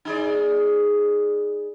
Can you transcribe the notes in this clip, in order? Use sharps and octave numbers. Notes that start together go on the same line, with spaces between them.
D#4 G#4 D5